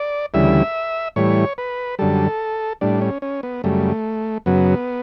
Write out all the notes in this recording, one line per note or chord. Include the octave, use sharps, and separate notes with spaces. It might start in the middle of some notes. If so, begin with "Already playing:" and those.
Already playing: D5
D2 C#3 E3 G3 E5
A2 E3 G3 C#5
B4
F#2 D3 G3 A4
A2 G3 D4
C#4
C#4
B3
F#2 C#3 G3 A3
F#2 C#3 F#3 B3